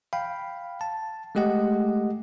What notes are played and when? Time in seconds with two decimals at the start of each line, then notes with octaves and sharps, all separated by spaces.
0.13 F5 G5 B5
0.81 A5
1.35 G#3 A3 G4 D#5 F#5